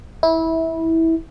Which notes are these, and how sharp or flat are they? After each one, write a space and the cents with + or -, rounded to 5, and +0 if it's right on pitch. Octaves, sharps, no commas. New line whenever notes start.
E4 -20